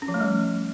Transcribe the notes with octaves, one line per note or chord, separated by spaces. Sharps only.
C#4
F3
A3
G3